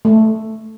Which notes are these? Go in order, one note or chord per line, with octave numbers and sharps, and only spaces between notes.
A3